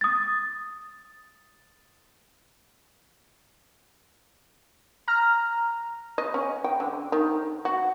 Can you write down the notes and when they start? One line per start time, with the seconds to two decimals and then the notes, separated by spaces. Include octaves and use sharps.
0.01 D#6 A6
5.08 A#5 F6
6.18 D#5
6.34 C#4
6.64 G5
6.80 D3
7.12 D#3
7.65 F#4